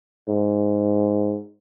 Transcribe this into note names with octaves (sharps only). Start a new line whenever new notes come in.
G#2